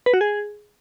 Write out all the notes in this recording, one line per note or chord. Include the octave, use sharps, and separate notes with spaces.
B4
F#4
G#4